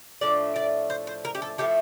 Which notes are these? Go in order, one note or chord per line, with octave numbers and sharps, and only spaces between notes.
A2 F3 A3 D4 D5
D5
C5
C5
A#4
G4
A4
A2 F3 A3 G4